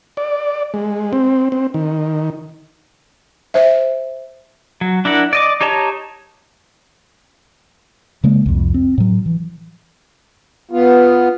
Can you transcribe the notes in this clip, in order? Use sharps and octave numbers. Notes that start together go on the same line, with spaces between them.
D5
G#3
C4
C4
D#3
C5 E5
F#3
D4 E4 A#4 F#5
D5 D#5 D6
D#4 G4 C#5 A5 A#5
C#3 G#3 A#3
C2 F2
C4
A2 F#3
E3
B3 F4